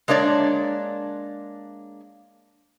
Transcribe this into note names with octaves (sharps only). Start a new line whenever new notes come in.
G#3 A#3 D4 C#5 D5